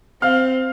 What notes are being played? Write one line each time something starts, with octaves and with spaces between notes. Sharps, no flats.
C4 F5 F6